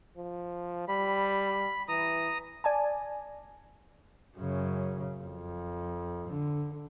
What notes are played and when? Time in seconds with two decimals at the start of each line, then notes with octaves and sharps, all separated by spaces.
0.17 F3
0.88 G3 B5
1.88 E3 A#5 D#6
2.64 D5 G#5 A5
4.37 F#2 C#3
5.23 F2
6.29 D3